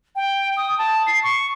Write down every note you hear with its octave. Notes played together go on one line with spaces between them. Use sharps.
G5
D#6
A5
C7
C#6